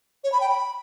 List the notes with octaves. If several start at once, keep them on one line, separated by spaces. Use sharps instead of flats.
C#5
B5
G5
B5